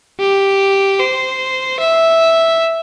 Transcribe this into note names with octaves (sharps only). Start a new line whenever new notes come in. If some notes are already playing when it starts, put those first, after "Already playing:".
G4
C5
E5